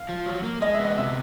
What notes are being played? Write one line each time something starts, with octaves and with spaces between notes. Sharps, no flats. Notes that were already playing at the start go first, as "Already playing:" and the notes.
Already playing: F5
F3
F#3
A#3
G#3 D#5
E5
B3
D#5
C3 E5